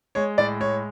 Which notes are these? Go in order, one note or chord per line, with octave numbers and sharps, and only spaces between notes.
G#3 C#5
A2 D5
G#3 C#5